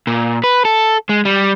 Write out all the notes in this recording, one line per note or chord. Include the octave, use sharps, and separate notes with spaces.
A#2
B4
A4
G#3
G3